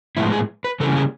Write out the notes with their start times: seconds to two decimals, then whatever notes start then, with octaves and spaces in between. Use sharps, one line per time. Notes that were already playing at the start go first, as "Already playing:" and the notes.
0.17 A2 F3 G#3 B3 E4
0.33 G#4
0.64 B4
0.80 C#3 E3 G3 A#3 C#4 A4
0.96 G#4